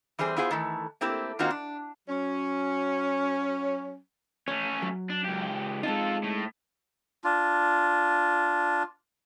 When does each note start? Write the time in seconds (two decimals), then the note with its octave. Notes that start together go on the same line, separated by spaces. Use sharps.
0.19 E3 G3 C4 G#4 C5
0.36 B3 E4 F4 G#4 C5
0.51 D#3 E3 A3
1.01 A3 A#3 C4 E4 G4
1.39 D#3 A#3 C4 D#4 F4 F#4
1.50 D4
2.09 F#3 C#4
4.48 A3 C#4 C#5
4.82 F#3
5.10 D4
5.24 C#2 G4
5.83 G#3 C4 D#4 F4 A4
6.23 A2
7.24 D4 F4